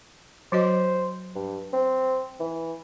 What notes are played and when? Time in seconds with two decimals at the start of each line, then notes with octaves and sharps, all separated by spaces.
0.52 F#3 F#4 C5 D#5
1.35 G2
1.73 C4
2.40 E3